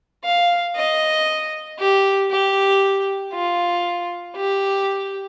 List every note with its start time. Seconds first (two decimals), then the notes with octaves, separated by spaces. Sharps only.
0.24 F5
0.76 D#5
1.79 G4
2.31 G4
3.33 F4
4.37 G4